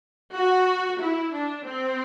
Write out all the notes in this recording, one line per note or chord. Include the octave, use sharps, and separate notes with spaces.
F#4
E4
D4
C4